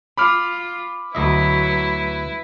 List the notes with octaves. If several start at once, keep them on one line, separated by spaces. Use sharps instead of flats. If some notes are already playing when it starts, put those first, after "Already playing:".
F4 B5 D6 F6
D2 F#3 E4 B4 D#5 E5